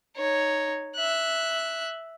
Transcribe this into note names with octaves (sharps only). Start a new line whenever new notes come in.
D#4 C#5
E5 F#6